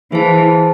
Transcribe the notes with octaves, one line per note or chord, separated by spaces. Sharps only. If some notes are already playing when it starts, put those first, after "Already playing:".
E3 E4 G#4 C5 F5 A5